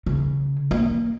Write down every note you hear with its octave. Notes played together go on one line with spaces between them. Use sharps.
C#3
A#3